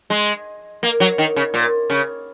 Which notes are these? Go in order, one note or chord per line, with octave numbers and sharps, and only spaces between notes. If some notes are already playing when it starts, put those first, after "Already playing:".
G#3
A#3
F#3
D#3
C#3
A#2
C#3